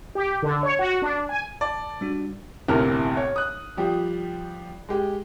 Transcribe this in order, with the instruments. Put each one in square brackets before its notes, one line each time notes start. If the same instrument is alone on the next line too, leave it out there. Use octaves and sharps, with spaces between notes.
[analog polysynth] G4
D3
C#5
F#4
D4
G#5
[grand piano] D5 [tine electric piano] A5
[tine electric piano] G3 D4 F#4
[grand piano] G1 C2 A2 C3 A#4 F6
C#5
D#6 F#6
F3 G3 G4
G#3 G4